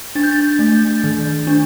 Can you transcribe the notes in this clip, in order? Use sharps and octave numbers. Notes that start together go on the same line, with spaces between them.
D4 A6
G6
A6
A3
D#3
D4